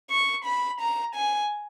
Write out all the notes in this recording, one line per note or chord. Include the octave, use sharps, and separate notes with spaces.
C#6
B5
A#5
G#5